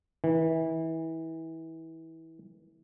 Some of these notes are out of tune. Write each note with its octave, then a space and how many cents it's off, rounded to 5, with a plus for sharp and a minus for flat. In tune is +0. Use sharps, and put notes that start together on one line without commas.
E3 -25